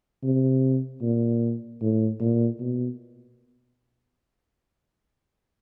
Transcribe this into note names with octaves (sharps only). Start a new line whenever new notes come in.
C3
A#2
A2
A#2
B2